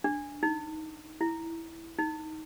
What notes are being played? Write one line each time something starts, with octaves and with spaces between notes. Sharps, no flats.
D4
D#4
E4
D#4